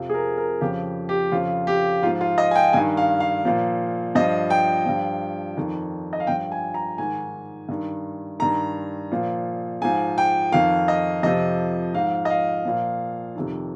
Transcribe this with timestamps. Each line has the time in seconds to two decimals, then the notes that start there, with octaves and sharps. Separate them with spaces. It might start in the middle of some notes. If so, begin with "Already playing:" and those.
Already playing: F2 C3 F3
0.10 G#4
0.14 A#4
0.38 A#4
0.61 F2 C#3 F3 G4
1.09 G4
1.32 F2 C#3 F3 F4
1.67 G4
2.02 G#2 F4
2.07 F3
2.21 F4
2.38 D#5
2.51 G#5
2.55 G5
2.73 G2 D#3 G#5
2.97 F5
3.20 F5
3.45 A#2 F3
4.15 G2 F3 D#5
4.50 G5
4.86 G2 F3
5.57 F2 D#3
6.13 D#5
6.20 F5
6.27 G2 F3 G5
6.52 G#5
6.74 A#5
6.98 G#2 D#3 G#5
7.69 G2 D#3
8.40 G2 D#3 A#5
9.11 A#2 F3
9.82 G#2 F3 G#5
10.18 G5
10.52 F2 D#3 F5
10.88 D#5
11.23 F2 C3 F3 D#5
11.94 G#2 F3 F5
12.25 D#5
12.30 F5
12.65 A#2 F3
13.35 F2 C3 D#3